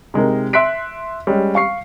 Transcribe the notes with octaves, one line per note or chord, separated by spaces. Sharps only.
C3 G#3 D#4 A#4
E5 C6 F#6 B6 D7
G3 G#3 C#4
F5 C#6 C7